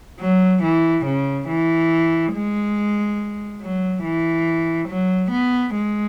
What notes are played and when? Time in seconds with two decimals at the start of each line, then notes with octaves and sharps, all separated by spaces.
0.21 F#3
0.63 E3
1.06 C#3
1.48 E3
2.33 G#3
3.61 F#3
4.04 E3
4.88 F#3
5.31 B3
5.74 G#3